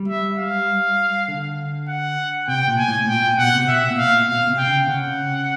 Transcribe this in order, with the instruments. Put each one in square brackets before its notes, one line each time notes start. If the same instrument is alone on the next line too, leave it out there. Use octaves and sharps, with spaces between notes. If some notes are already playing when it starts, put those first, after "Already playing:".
Already playing: [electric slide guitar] G3
[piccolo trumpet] E5
F5
[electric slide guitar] D3
[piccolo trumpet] F#5
[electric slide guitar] C3 [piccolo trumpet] G5
[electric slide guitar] A#2
[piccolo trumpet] G#5
[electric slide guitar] A2
[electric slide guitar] A#2 [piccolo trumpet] G5
[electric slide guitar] A#2
[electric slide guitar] B2 [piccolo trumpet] F#5
[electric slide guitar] C3
[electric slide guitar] B2 [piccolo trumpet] E5
[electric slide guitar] A#2
[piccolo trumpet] F5
[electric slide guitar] A#2
[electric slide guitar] B2 [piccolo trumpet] F5
[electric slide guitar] B2
C3
[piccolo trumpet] G5
[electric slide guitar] C#3
[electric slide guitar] C#3 [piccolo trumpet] F#5